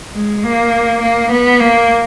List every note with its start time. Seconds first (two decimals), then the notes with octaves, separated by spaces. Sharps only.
0.14 G#3
0.44 A#3
1.01 A#3
1.31 B3
1.60 A#3